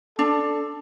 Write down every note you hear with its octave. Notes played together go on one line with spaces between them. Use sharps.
D4 A4